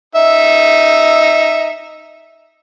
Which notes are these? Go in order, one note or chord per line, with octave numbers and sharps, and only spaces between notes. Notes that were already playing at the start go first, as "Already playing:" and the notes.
D#4 E5